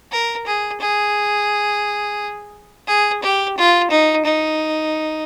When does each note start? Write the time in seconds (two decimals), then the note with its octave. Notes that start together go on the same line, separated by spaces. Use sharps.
0.12 A#4
0.47 G#4
0.80 G#4
2.87 G#4
3.23 G4
3.57 F4
3.91 D#4
4.26 D#4